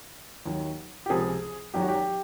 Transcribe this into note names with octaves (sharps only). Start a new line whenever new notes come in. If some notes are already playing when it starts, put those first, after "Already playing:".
D#2 D#3 F#3
G4
C#2 C3 F3 G#4
G#1 F#2 D#3 F#3 G4
F#4
G4